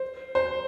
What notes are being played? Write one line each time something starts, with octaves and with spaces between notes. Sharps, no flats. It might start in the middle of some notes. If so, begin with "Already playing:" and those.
Already playing: C5
C5